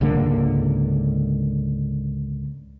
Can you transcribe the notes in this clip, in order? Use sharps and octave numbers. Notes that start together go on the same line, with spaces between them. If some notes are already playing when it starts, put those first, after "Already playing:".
C#2 G#2 D3 A#3